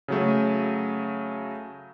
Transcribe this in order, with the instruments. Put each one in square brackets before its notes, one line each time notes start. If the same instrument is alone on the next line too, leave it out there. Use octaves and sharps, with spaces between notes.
[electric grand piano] C#3 F#3 A3